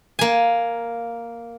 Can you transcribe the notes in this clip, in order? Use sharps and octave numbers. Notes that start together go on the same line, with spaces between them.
A#3 G#5